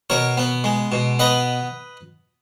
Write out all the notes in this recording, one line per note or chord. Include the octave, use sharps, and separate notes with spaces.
B2 A#4 C#5
B3
G#3
B2
B3 B4 D#5